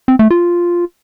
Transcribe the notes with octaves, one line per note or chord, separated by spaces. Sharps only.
C4
A3
F4